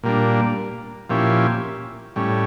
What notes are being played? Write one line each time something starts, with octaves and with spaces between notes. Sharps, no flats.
A#2 G3 A#3 D4
A#2 F3 C#4 E4 G4
A2 G3 C#4